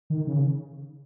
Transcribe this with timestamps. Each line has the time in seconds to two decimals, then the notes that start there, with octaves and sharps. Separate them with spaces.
0.10 D#3
0.27 C#3